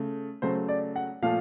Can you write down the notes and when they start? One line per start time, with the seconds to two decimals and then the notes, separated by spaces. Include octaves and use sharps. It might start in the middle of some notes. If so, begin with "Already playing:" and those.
Already playing: C#3 A3
0.42 C#3 F#3 A3 C5
0.68 D5
0.96 F#5
1.22 A#2 F3 A3 F5